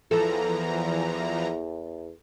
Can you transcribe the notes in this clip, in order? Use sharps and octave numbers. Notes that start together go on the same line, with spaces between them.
E2 E3 F3 A4 A#5